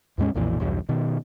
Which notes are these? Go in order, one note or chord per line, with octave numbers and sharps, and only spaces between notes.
E2 A2 G#3 C#4
B1 F2 A#2 E3
B1 E2 G2
B2 D#3